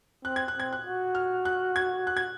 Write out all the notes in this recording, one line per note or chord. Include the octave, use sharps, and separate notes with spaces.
C4 F#6
G#6
F#6
C4
G#6
F#6
F#4
F6
F#6
G#6
F#6
G#6